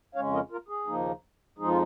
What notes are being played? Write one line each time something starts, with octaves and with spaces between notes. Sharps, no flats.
F2 C#3 G#3 C#4 C#5 F5
A#4 D#5
F4 A#4
G#4
D#2 C#3 F3 A#3 D#4
F2 F3 G#3 D#4 G#4
F4